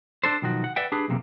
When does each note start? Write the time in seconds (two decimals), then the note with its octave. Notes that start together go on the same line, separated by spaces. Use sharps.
0.24 D4 A4 C5
0.42 B1 D#3 F3 F#4
0.64 F#5
0.76 B4 D5 E5 F#5 G5
0.92 D4 G4 G#4 B4
1.08 B1 E2 C3 A#3